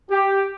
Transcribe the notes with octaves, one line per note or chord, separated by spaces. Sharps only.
G4